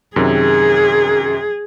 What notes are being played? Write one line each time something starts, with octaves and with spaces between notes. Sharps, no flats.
F#2 C3 D#3 G#4